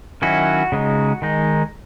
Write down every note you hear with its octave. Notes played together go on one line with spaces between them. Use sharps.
D#3 F#3 C#4 E4 F#4
C#3 G#3 D#4
D#3 G#3 D#4